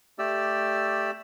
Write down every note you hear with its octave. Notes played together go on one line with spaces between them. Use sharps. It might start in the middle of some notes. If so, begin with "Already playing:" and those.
A3 G4 D5 E6